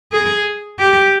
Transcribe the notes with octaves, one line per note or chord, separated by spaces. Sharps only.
G#4
G4